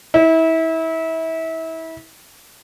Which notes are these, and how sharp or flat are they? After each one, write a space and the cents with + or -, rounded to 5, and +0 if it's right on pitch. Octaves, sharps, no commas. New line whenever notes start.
E4 -30